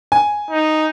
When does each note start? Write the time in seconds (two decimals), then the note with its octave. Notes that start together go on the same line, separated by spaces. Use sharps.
0.12 G#5
0.50 D#4